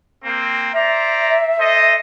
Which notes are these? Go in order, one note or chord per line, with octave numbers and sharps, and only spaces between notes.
A#3 C4
C5 D5 E5 A#5
A4 C5 D#5